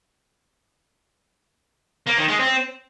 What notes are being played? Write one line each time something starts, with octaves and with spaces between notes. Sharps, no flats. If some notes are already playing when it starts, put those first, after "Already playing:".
A#3
D#3
G#3
C4